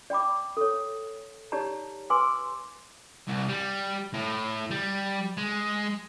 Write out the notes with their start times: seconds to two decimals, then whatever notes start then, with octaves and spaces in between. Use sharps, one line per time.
0.10 D5 G5 B5 D6
0.57 A4 C#5
1.52 D#4 G4 C#5 D5 A5 A#5
2.10 B4 G#5 C6 D6 E6
3.27 C2
3.49 G3
4.13 A2
4.71 G3
5.37 G#3